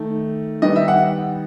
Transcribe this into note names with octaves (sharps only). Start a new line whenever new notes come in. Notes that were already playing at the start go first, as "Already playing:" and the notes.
Already playing: D#3 A3
D#3 G3 B3 D#5
E5
F#5